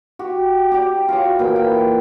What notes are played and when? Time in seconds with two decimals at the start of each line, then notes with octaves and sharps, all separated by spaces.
0.19 F#4 G4
0.72 G4 D5
1.09 F4 F#4 G#4 C#5
1.39 A#2 E3 G5
1.56 G5